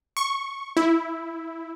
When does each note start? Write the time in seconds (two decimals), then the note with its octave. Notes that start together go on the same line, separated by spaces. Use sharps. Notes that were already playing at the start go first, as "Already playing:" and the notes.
0.17 C#6
0.77 E4